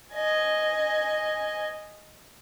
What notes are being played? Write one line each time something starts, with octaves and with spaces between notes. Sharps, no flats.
D#5 G#5